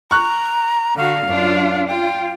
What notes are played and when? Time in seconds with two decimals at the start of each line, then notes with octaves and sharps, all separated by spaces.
0.11 A#5 C#6 F#6
0.97 D3 F#4 F5
1.27 F#2 D4 F4
1.88 F4 G5